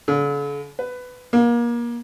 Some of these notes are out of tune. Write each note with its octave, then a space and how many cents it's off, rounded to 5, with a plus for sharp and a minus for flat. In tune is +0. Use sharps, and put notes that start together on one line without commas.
D3 -45
B4 +15
A#3 +30